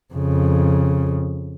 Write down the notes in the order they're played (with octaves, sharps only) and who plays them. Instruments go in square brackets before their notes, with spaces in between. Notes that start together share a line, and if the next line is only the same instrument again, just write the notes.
[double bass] F2 C#3